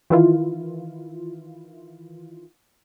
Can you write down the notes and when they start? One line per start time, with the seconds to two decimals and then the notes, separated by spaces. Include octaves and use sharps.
0.10 D#3 E3 E4 F4